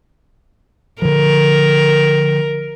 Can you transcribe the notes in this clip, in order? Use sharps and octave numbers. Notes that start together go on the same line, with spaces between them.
D3 F3 A#4